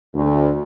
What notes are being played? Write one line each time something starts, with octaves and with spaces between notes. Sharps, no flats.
D2